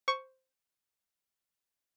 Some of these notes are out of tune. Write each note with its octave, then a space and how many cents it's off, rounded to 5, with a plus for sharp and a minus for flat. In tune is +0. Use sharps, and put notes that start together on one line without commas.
C5 +0 C#6 +5